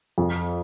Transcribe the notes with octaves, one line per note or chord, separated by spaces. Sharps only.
F2